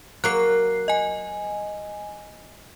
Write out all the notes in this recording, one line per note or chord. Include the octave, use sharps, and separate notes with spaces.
F#3 A#3 F#6 C7
D#5 G#5